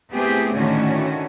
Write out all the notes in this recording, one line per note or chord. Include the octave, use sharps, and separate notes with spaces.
A3 B3 C4 E4 G4 G#4
A2 D3 D#3 A3 C#4 F#4